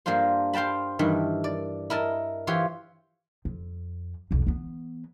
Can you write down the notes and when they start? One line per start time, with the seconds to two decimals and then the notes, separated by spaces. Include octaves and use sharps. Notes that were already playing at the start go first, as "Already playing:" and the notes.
0.06 G2 A#3 D4 F4 C5
0.53 C5 F5 G5 A5 B5
0.99 G2 D#3 E3
1.44 D5
1.90 E4 A#4 D#5 A5
2.47 E3 F4 G4 C5 C#5
3.45 F2
4.31 B1 E2
4.47 E3 B3